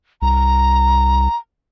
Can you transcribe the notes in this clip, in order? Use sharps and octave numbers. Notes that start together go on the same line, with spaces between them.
C2 A#5